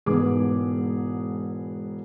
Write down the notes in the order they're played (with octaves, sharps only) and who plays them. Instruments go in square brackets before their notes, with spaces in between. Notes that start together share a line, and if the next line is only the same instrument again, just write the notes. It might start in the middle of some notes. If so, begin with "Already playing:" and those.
[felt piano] E1 G#2 B3 G#4 D6